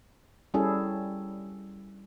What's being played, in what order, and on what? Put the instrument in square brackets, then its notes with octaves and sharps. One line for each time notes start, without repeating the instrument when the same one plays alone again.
[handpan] G3 C#4 E4 G#4 A4